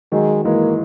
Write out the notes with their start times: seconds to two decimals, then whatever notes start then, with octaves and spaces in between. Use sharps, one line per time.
0.12 D#3 F#3 G#3
0.45 E3 G#3 A#3